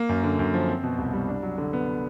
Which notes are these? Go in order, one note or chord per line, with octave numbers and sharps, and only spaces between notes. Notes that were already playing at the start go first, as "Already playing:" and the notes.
Already playing: A#3
F#2
D3
F#2
F3
C4
B2
C2
G3
D4
F#3
D3
B3